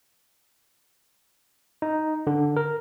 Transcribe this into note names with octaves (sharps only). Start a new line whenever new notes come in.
D#4
D3
A#4